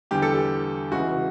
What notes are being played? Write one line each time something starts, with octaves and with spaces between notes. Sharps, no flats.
E2 D3 G3 G4
A4
G4
C#2 C#3 E3 F#4